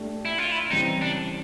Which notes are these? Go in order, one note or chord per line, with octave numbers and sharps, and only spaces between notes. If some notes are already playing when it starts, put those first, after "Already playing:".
Already playing: A3 D4 G4
E4
F4
E4
C#3 E3 G3 C4 D#4
D4